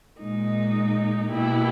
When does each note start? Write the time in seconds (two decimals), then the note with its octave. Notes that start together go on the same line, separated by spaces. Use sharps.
0.22 A#2 G#3 D#4
1.29 B2 A#3 E4 G4